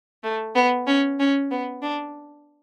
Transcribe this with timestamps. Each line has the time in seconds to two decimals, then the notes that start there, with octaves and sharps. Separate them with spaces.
0.24 A3
0.55 B3
0.87 C#4
1.20 C#4
1.51 B3
1.82 D4